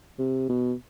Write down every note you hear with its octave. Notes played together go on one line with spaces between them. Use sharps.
C3
B2